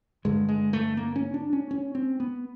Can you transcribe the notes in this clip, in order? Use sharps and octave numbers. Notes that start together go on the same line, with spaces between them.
G2 D3 G#3
G#3
A3
A#3
C#4
D4
C#4
C#4
C4
B3